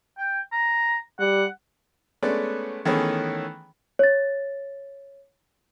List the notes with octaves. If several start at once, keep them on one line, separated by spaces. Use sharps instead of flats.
G5
A#5
G3 F#5
G#3 A3 B3 C#4 B4 D5
D#3 E3 A3 B3 C#4 G#4
C#5 A6